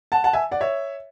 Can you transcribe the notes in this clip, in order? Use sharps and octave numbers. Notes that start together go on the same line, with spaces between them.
F#5 A5
F#5 A5
E5 G#5
D5 F#5
C#5 E5